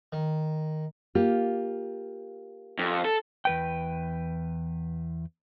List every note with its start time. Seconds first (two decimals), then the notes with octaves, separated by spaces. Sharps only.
0.12 D#3
1.15 A#3 F4 G4
2.79 F2
3.05 A4
3.45 E2 B4 G5